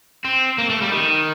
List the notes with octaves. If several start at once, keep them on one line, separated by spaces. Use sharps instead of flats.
C4
A#3
A3
G3
D#3